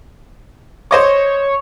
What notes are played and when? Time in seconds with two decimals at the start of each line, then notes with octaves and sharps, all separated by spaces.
0.91 C5 C#5 D#5 D6